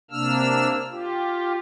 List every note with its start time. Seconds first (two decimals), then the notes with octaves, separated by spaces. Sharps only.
0.11 C3 A#3 D4 E6 F6
0.91 F4 G4